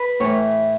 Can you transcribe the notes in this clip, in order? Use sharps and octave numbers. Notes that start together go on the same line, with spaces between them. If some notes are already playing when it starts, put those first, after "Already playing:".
Already playing: B4
A2 E3 A3 C#5